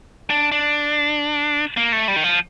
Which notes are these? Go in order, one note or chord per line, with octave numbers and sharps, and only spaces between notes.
D4
D4
A#3
A3
G3
D#3
F3